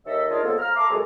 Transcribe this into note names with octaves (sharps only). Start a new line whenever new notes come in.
D#2 D#3 A4 D#5 E5 E6
D4 D#4 F4 G#4 A#4 C#5
C#2 F3 A#3 B3 A4
F5 A#5 F6
E5 A5 A#5 C6 D6
C#2 F#2 G#3 F#4 G#4 A4